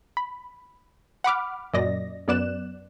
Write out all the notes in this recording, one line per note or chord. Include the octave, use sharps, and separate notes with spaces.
B5
F#5 B5 D6 F6
F#2 A#2 D5 D#5 A#6
F#2 B3 D5 F#6 E7